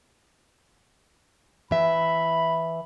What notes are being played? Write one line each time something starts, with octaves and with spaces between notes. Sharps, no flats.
E3 E5 B5